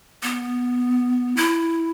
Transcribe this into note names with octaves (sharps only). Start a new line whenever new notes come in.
B3
E4